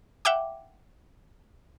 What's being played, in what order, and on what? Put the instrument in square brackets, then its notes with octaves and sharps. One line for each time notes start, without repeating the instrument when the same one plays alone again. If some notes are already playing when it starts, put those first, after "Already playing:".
[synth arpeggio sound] E5 F#5 G5 D6